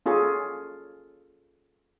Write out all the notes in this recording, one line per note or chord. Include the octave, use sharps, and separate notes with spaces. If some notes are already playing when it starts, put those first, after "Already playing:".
C#4 F4 G#4 A4 C#6